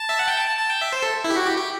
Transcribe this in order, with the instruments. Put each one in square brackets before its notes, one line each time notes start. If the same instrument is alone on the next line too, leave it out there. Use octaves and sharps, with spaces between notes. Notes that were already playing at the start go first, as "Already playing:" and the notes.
Already playing: [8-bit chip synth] A5
E5
F#5
G5
A5
A5
A5
G5
E5
C5
A4
E4
G4
F#4
G4
G4